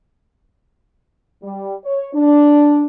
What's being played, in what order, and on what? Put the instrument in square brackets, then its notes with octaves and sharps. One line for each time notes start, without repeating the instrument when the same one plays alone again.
[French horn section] G3
C#5
D4